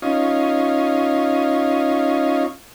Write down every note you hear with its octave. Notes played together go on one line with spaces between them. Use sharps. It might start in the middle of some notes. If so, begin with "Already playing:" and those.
C#4 D#4 F4